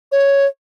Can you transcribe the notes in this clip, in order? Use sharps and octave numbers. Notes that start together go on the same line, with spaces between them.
C#5